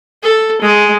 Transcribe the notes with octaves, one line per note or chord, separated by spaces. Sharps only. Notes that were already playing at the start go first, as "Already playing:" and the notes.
A4
G#3